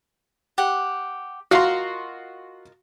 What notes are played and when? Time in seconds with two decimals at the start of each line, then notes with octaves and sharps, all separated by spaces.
0.58 G4 F#5
1.51 F4 F#4 A#4 D#5 F5 C6